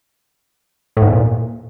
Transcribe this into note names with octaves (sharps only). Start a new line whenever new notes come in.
A2
G#2
E2
A#2